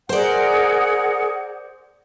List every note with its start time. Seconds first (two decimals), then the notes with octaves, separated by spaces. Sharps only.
0.09 G#4 A#4 C5 D5 F#5